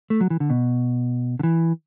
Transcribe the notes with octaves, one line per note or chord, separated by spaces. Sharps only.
A3
F#3
E3
D3
B2
D3
E3